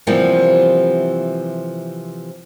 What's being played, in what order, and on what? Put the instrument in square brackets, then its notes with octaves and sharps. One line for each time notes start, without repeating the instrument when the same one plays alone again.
[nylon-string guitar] C3 E3 F3 G3 A#3 B3